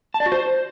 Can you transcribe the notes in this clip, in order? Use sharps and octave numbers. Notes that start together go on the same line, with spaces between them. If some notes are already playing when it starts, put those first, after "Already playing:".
A5
D5
F#4
C5